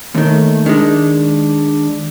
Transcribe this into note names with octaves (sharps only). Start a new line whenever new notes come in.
D#2 D#3 A3
D#3 G#3 D4